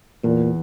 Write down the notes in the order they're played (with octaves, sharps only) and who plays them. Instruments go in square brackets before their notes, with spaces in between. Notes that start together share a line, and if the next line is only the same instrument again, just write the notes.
[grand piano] E2 [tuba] A#2